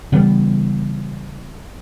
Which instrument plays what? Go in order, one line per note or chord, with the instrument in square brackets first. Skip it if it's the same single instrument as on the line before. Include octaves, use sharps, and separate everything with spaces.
[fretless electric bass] C#3 E3 G3 B3